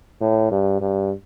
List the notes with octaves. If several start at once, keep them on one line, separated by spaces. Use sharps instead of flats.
A2
G2
G2